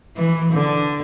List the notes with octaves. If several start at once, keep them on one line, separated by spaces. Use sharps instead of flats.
E3
D3